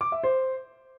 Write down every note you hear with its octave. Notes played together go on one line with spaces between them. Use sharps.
D6
E5
C5